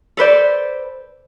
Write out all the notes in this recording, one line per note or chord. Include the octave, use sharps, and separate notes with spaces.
A4 B4 C5 D5